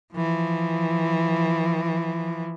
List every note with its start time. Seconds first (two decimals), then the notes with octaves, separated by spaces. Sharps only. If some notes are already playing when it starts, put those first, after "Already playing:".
0.14 E3 F3